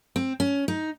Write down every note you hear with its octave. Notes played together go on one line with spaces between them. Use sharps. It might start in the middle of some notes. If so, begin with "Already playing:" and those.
C4
C#4
D#4